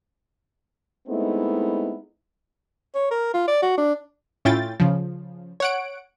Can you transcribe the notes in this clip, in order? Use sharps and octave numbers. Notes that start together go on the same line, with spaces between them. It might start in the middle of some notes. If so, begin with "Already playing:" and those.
G#3 A3 B3 C4 D#4 E4
C#5
A#4
F4
D5
F#4
D4
A2 C#4 E4 F4 G5 A6
C#3 F3
C#5 F#5 D7